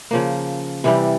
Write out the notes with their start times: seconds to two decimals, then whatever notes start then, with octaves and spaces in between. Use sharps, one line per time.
0.11 C#3 F3 A#3
0.84 C3 E3 G3